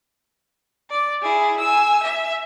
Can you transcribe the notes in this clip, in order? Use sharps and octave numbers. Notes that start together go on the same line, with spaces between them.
D5
E4 G#4
G#5 E6
E5